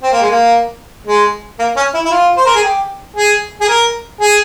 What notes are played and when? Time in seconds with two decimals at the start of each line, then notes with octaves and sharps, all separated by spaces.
0.03 C4
0.12 A#3
0.21 G#3
0.31 A#3
1.07 G#3
1.59 A#3
1.76 C#4
1.94 E4
2.05 E4
2.11 F4
2.37 C5
2.46 A#4
2.55 G#4
2.63 G4
3.16 G#4
3.61 G#4
3.68 A#4
4.21 G#4